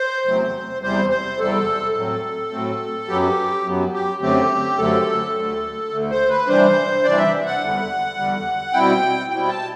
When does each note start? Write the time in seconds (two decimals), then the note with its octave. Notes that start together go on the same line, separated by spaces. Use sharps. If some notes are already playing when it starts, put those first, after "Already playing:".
Already playing: C5
0.25 E2 C3 F#3 A3 C4
0.82 E2 C3 G3 C5
1.10 C5
1.39 E2 C3 G3 A4
1.95 A2 F#3 A3 C4
2.51 A2 F#3 A3 C4
3.08 F#2 F#3 B3 G4
3.65 F#2 F#3 B3
3.93 G4
4.21 F#2 D3 F#3 A3 C4 G4
4.78 F#2 D3 F#3 A3 C4 A4
5.35 D2 D3 A3
5.90 D2 D3 A3
6.10 C5
6.29 B4
6.47 C3 E3 G3 D4 C5
7.04 C3 E3 G3 D4 D5
7.18 E5
7.46 F#5
7.60 E2 D3 G3
8.17 E2 D3 G3
8.73 B2 G3 C4 E4 G5
9.30 B2 G3 C4 E4 G5
9.48 A5